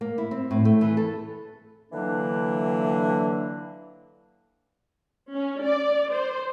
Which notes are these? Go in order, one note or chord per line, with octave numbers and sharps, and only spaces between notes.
A#3
E4
C4
A2
A3
E3
A4
D3 E3 F#3 A#3 D4
C#4
D5
C5